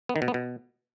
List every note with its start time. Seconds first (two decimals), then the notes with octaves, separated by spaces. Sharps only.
0.09 B3
0.16 D#3
0.22 B2
0.28 B3
0.34 B2